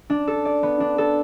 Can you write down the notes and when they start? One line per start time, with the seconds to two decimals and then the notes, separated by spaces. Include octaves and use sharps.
0.10 D4
0.27 A4
0.45 D5
0.63 B3
0.80 D4
0.98 A4